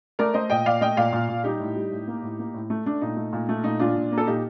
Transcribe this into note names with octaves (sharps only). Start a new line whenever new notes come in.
A3 A#4 D5
A3 C5 D#5
A#2 D#5 G5
A#2 D5 F5
A3 D#5 G5
A#2 D5 F5
A#2
A#2
G3 D#4 G4
A2
G3
A2
A#3
A2
A#3
A2
A3
A3 D4
A#2 D#4
A3
A#2
A3
A#2 D#4
A#2 D4 F4
A#2
A#3
A4
A#2 D#4 G4